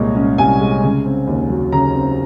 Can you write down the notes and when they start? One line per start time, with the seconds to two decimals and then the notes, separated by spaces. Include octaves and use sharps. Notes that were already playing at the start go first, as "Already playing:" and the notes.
Already playing: C2 A#2 G#3 C#5 D#5
0.15 C#4
0.38 C2 G#5
0.61 G#3
0.83 C#3
1.05 C4
1.27 D#2
1.49 F#3
1.72 C#3 A#5
1.94 C4